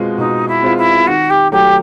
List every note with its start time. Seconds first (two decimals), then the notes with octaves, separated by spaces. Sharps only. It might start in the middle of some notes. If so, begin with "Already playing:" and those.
Already playing: B2 G#3 C4 F4
0.18 B2 D#4
0.47 E4
0.62 G#3 C4 F4
0.77 E4
1.07 D#3 F#4
1.30 G4
1.51 F#3 A3 G4